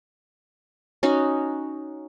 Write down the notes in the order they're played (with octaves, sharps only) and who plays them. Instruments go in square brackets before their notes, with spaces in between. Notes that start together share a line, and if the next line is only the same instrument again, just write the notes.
[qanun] C#4 D#4 F#4